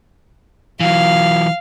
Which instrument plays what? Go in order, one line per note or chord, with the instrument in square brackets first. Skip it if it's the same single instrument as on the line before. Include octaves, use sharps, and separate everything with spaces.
[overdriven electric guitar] E3 F#3 [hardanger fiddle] F5